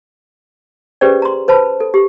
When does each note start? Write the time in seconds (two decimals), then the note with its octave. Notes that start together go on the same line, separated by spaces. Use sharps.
1.01 C#4 G4 G#4 B4 C5 D5
1.22 A#5 C6
1.48 B4 C5 A5 B5
1.80 A4
1.94 G4